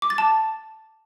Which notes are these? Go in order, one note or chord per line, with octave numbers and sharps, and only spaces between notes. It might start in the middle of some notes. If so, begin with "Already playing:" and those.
D6
A6
A5